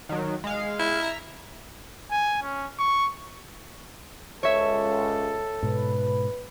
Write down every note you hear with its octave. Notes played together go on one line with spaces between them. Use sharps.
D#3 F#3
G#3 F5
E4
E5 A#5
G#5
C#4
C#6
C#2 A4 C#5 E5
G#2 B2 B4